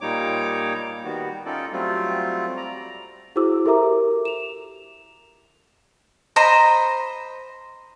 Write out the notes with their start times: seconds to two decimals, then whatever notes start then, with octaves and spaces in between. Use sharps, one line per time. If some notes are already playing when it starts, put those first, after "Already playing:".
0.01 A#2 G3 A#3 D#4 C#5 D6
1.05 D#3 G3 B3 F#4
1.46 C#4 D#4 F4 A4 D5
1.72 F#3 G3 A3 C4 F4
2.57 D5 A#5
3.36 E4 F#4 G#4 C5 D6 E6
3.65 G4 A4 A#4 E5 A#5 D6
4.25 E7 F7
6.36 C5 D#5 A#5 B5